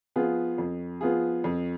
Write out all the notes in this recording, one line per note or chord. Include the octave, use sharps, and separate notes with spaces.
F3 B3 F4 G#4
F2
F3 B3 F4 G#4
F2